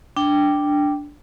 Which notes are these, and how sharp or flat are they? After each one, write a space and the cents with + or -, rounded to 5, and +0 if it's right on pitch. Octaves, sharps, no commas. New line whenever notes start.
D4 +0 G5 +0